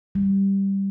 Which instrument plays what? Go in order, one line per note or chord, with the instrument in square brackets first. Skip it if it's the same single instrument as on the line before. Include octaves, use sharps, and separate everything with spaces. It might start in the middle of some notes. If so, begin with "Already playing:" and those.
[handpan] G3